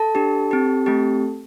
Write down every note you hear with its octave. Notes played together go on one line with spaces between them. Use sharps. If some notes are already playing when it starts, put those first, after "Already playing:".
Already playing: A4 A5
D4 G4
C4 G4
A3 C4 G4